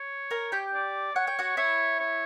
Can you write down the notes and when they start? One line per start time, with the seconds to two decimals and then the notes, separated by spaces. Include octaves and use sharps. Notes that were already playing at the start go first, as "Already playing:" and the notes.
Already playing: C#5
0.31 A#4 A#5
0.52 G4 G5
0.73 D5
1.15 C#5 F#5
1.27 G5
1.39 F#4 F#5
1.57 E4 C#5 E5
1.99 C#5